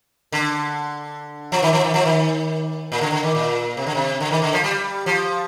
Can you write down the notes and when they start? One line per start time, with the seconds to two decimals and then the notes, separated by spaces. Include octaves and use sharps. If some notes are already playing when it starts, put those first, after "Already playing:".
0.32 D3
1.52 F3
1.63 D#3
1.73 F3
1.84 D#3
1.94 F3
2.05 D#3
2.92 A#2
3.01 D3
3.12 D3
3.23 D#3
3.35 A#2
3.77 C3
3.87 D3
3.95 C3
4.20 D3
4.31 D#3
4.42 D3
4.53 F3
4.64 G3
5.06 F3